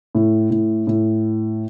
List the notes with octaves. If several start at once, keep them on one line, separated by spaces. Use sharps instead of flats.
A2
A2
A2